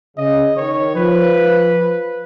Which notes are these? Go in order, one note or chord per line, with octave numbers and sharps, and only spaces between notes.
C#3 D#5
D#3 C#5
F3 B4